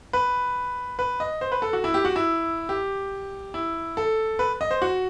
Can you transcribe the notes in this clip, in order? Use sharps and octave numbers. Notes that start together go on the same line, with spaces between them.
B4
B4
D#5
C5
B4
A4
F#4
E4
G4
F#4
E4
G4
E4
A4
B4
D#5
C5
F#4